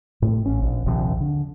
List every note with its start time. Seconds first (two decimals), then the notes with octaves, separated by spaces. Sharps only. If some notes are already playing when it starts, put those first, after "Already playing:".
0.22 A2
0.46 A1 C#4
0.62 A#1
0.86 A#1 D#2 C3 F3
1.21 D3